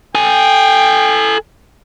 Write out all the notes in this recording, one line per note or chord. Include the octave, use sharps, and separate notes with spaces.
A4 G5 G#5